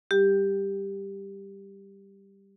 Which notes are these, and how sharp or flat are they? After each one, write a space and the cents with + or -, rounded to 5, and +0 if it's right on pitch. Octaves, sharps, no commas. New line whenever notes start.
G3 +0 G4 +10